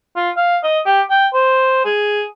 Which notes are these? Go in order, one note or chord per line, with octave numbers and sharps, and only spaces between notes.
F4
F5
D#5
G4
G5
C5
G#4